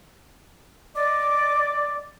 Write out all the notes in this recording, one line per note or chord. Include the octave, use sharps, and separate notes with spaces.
D5 D#5 D6